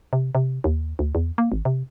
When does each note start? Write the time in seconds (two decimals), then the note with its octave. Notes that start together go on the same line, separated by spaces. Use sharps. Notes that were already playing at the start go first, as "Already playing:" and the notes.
0.13 C3
0.35 C3
0.64 D#2
0.99 D2
1.15 E2
1.38 A#3
1.52 G#1
1.65 C3